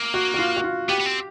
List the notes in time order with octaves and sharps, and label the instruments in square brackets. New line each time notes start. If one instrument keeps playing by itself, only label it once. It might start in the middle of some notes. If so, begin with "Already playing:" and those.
Already playing: [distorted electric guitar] A#3
[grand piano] F#4
F#4
F4
F#4
F4
[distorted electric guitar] B3 [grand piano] G4
[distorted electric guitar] B3
C4